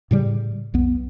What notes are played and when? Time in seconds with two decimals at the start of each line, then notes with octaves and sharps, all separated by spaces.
0.11 A2 C#3 G3
0.74 B1 F2 B3